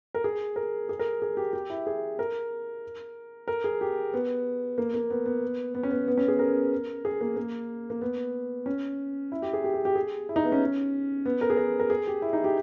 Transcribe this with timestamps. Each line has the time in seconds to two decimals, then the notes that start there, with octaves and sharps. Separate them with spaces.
0.14 A#4
0.24 G#4
0.56 A#4
0.89 G#4
0.99 A#4
1.22 G#4
1.37 G4
1.53 G4
1.70 E4
1.87 G#4
2.19 A#4
3.48 A#4
3.64 G#4
3.81 G4
4.13 B3
4.78 A#3
4.94 A#3
5.10 B3
5.26 B3
5.75 B3
5.83 C#4
5.91 B3
6.08 B3
6.17 C#4
6.28 G#4
6.39 A#4
7.05 G#4
7.21 A#3
7.36 A#3
7.90 A#3
8.01 B3
8.66 C#4
9.32 E4
9.42 G4
9.53 G#4
9.64 G4
9.74 G#4
9.85 G4
9.95 G#4
10.29 E4
10.36 D#4
10.45 B3
10.52 C#4
11.25 B3
11.41 A#4
11.50 G#4
11.57 A#4
11.80 A#4
11.90 G#4
12.07 G4
12.22 E4
12.33 D#4
12.44 G4